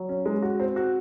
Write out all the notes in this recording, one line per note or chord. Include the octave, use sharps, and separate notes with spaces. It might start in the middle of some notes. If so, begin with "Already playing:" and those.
Already playing: F#3
C#4
G#3
F#4
C4
F#4